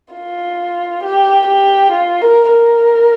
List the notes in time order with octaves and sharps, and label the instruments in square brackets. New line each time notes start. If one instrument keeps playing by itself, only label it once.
[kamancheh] F4
G4
G4
F4
A#4
A#4